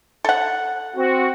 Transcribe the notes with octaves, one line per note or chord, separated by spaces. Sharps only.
A4 F#5
C4 F#4